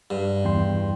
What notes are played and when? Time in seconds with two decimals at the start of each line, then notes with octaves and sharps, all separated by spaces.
0.10 G2
0.45 E2 G5 C6